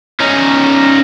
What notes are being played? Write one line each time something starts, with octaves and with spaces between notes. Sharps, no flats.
C#4 D#4